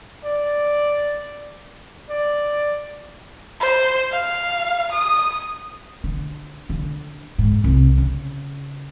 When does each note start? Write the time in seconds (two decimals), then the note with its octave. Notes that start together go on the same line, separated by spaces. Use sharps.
0.25 D5
2.10 D5
3.61 C5
4.11 F5
4.92 D#6
6.04 D3
6.70 D3
7.38 G#2
7.64 C2
7.98 C#3